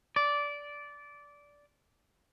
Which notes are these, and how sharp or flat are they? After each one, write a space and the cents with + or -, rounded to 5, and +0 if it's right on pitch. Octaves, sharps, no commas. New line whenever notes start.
D5 -15